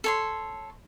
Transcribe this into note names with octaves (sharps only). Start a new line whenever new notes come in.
A4 C#5 C6